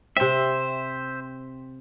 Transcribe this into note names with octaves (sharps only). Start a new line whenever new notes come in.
C3 C4 C5 E5